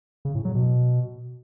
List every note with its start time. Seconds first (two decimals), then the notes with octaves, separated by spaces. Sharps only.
0.25 C#3
0.35 A2
0.45 F#3
0.55 B2